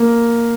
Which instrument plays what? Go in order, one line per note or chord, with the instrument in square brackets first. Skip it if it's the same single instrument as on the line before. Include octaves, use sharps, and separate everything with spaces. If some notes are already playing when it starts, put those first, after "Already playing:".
Already playing: [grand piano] A#3